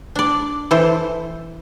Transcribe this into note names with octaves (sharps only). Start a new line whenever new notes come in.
D4 D5
E3 A4 C5